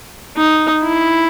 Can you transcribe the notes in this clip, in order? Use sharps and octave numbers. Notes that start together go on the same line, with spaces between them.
D#4
E4